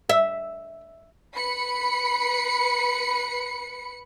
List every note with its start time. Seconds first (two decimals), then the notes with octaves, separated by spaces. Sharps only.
0.09 E5
1.36 B4 B5 C#7